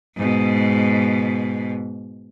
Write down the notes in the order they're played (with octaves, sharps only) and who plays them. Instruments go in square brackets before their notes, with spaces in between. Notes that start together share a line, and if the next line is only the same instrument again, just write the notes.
[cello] G#2 B2